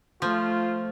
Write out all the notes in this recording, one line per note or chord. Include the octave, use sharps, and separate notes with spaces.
F3 A3 F4